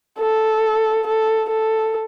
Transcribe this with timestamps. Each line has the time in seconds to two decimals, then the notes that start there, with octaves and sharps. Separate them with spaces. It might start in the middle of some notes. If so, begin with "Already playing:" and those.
0.19 A4
1.06 A4
1.50 A4